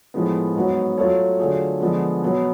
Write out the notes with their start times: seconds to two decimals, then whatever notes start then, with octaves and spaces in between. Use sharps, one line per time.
0.14 A2 F3 G#3 B3
0.56 G#2 F#3 B3 F#4 C#5
0.98 F#3 A3 F4 A4 C#5
1.39 D3 F#3 A3 F4 G#4
1.80 D3 F3 G#3 B3
2.22 B2 F#3 B3